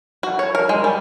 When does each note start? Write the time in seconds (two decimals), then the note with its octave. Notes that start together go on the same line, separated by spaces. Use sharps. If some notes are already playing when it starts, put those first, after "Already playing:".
0.23 F#4
0.39 C#5
0.55 A#4
0.69 G#3
0.84 G3